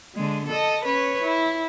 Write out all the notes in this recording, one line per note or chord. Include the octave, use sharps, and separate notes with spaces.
D3 G#3
A4 D#5
C#4 B4 C#5
E4